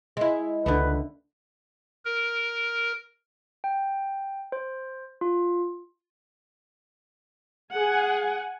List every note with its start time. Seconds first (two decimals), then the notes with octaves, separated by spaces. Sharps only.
0.17 G#3 E4
0.66 C#2 D3 D#3 A3 B4
2.05 A#4
3.64 G5
4.52 C5
5.21 F4
7.75 G#4 F#5 G#5